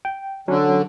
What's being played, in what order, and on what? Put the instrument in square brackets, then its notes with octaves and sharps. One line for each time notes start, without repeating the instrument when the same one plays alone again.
[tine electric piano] G5
[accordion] D3 [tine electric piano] F#3 C#4